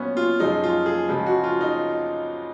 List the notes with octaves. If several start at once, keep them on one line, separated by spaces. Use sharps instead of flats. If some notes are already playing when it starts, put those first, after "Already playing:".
Already playing: A#2 F#3 B3 C#4
F4
F#2 C#3 F3 G#3 D#4
F4
G#4
C#2 C#3 F3 G#3
F#4
F4
D#4